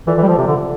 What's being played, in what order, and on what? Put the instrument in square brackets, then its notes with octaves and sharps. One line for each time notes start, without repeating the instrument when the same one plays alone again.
[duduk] E3 [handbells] F4 A4 D5
[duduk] E3
G3
F3
C3
D3